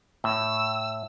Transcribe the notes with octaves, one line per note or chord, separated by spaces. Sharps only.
A2 E6